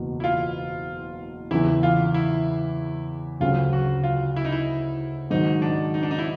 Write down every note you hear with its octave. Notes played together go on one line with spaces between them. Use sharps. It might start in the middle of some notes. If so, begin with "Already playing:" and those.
Already playing: F#1 E2 B2
E4
F4
E2 C#3 E3 E4
F4
E4
D2 C#3 F#3 F4
F#4
F4
E4
D#4
E4
G#2 D#3 F#3 D#4
D4
D#4
D4
D#4
E4